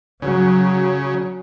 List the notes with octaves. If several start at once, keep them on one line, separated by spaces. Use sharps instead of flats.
C#3 F#3